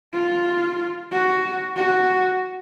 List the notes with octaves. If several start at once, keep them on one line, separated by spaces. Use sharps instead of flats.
F4
F#4
F#4